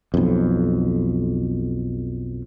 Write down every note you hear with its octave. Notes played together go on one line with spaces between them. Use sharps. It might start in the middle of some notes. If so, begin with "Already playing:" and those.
B1 F2